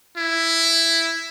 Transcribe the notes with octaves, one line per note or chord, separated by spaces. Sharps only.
E4